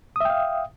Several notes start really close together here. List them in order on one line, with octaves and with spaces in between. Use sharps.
D#6 E5 G5 F5